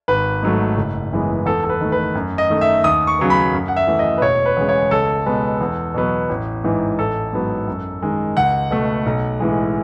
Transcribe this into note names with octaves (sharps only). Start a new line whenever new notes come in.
G#1 B4
G#2 F#3 A3
F#1
F#2 E3 G#3 B3
E2 A4
A4
B4
D#3 A3
B4
F#2
D#5
D#3 A3
E5
D#2 D#6
C#6
C#3 F#3 B3
B5
F#2
F#5
E5
E3 A3
D#5
B4
E1 C#5
B4
E2 C#3 G#3
C#5
C#2 A4
B2 G#3 B3
E2
B2 F#3 B3
A1
G#2 E3
A1 A4
G#2 F#3 B3
F#2
D#3 G#3
C#2 F#5
B2 A3
B1
A2 E3 G#3